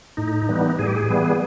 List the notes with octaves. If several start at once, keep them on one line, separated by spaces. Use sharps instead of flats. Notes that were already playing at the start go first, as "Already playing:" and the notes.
A2 D#4
E3 G3 B3
A2 G#4
G4
G#4
E3 G3 B3